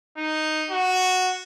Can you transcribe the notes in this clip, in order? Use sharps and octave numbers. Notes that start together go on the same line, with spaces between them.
D#4
F#4